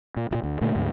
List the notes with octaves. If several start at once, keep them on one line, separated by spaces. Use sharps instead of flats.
A#2
D2 A#2
D2
A#2 D3 A3
D2 G#2